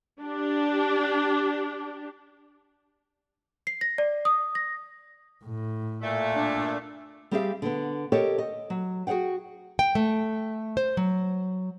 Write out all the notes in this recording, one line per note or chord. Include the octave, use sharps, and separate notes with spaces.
D4 G4
C7
A#6
D5
D#6
A#6
A2
A#2 A3
D4
G3 C4 G4 G#4 E5 F5
D3 B3
G4 A4 A#4 C#5 D#5 G5
D#5
F#3
F#4 G#4 C#5 F#5 G5
G5
A3
C5
F#3